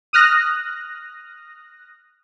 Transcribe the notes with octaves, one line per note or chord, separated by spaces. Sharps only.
D#6 F6 F#6 A#6